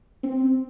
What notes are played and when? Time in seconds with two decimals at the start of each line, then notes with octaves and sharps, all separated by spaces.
0.23 C4